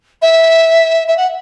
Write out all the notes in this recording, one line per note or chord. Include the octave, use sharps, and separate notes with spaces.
E5
E5
F#5